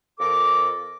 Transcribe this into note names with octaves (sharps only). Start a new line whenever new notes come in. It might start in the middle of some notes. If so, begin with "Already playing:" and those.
F2 A4 A#4 D6